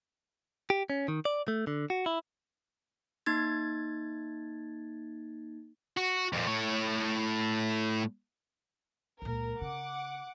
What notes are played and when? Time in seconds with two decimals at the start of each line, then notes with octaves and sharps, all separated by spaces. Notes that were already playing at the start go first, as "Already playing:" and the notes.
0.70 G4
0.90 C#4
1.08 D#3
1.25 D5
1.48 A3
1.67 D3
1.90 F#4
2.06 E4
3.26 A#3 D#4 G#6 A6
5.97 F#4
6.33 F2 A#2
6.47 A2 C#5
9.22 C#2 A#2 A#4
9.61 C#3 F#5 D6